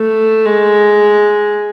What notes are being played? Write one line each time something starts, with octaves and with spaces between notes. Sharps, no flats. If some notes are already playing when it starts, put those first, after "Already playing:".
Already playing: A3
G#3